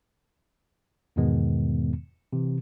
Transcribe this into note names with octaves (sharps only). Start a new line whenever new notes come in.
E2 G#2 B2 D#3 G#3 B3
C3 E3